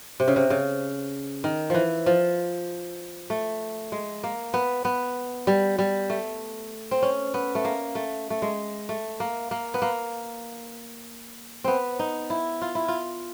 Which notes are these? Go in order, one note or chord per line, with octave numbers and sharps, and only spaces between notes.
C3
C#3
C3
C#3
D#3
E3 F3
F3
A3
G#3
A#3
B3
B3
G3
G3
A3
C4
C#4
B3
A3
A#3
A3
A3
G#3
A3
A#3
A#3
B3
A#3
B3 C4
D#4
E4
F4
E4
F4